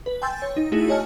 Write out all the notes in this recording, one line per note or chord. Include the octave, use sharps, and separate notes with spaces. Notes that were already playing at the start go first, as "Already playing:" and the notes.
B4
G5 G#5 C6 E6 G6 A6
C#5
D#4
A3 D#4 E4 F#4 G#4
F#4 C#5 D#5 G#5 A5 F6